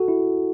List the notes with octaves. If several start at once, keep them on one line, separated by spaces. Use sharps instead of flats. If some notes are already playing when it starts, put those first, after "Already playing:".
Already playing: F#4 A4
E4